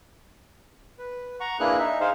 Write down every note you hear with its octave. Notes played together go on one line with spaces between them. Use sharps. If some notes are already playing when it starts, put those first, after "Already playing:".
B4
F#5 A#5 C#6
A#3 D4 E4 G#4 B4 F#6
D#4 E5
D#4 G#4 C5 F5